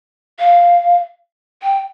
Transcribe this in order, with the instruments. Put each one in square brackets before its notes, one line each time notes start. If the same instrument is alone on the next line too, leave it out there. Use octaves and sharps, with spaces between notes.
[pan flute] F5
G5